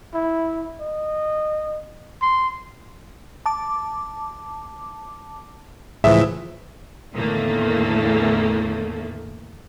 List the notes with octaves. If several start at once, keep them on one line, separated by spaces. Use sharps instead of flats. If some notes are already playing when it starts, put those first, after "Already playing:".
E4
D#5
C6
A5 D6
C#2 A2 E3 F3 G#4 E5
E2 A2 D3 D#3 A3 A#3